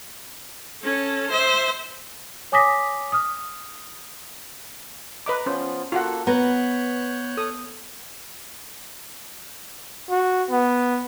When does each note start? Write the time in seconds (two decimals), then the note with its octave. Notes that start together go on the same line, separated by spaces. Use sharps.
0.82 C#4 A4
1.29 C5 E5
2.52 C#5 G#5 D6 D#6 A#6 B6
3.12 D#6 F6
5.26 B4 D#5 A#5 D6
5.46 F3 B3 C#4 F4 C5
5.92 A#3 F4 F#4 A4 F#5
6.27 B3 C#5 A#5 F#6 G6
7.37 A4 D#6
10.10 F#4
10.51 B3